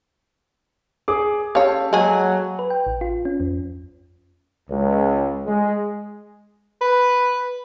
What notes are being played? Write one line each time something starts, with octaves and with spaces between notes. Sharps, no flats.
G#4 D6
C#4 G4 A4 C#5 F5
F#3 G#3 A#3 G#4
B4
G5
A1
F4
C#4
F2
C#2
G#3
B4